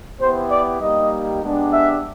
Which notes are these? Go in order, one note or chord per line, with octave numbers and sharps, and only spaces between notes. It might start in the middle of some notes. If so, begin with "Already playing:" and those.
B3 E4 G4 C5
D5
G3 A#3 D#4 G4 D#5
G#3 B3 D4 G4
E5